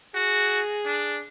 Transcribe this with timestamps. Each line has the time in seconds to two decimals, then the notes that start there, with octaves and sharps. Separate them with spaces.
0.15 F#4 G#4
0.86 D4